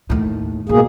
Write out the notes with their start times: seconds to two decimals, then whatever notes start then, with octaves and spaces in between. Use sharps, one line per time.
0.10 D#2 A2
0.69 G#2 B2 A#3 G#4